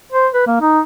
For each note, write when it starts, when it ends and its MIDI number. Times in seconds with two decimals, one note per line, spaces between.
0.12 0.27 72
0.33 0.47 71
0.47 0.56 58
0.61 0.80 63